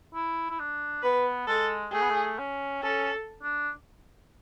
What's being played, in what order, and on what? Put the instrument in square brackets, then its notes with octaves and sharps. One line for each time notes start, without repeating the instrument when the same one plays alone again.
[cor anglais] E4
E4
D4
[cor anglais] B3 [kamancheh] B4
[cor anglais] G#3 [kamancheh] A4
[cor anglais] A3 [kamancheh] G#4
[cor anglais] B3
A3
C#4
[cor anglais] C#4 [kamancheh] A4
[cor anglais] D4